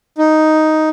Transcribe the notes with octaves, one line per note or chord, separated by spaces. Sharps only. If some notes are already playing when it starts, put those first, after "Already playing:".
D#4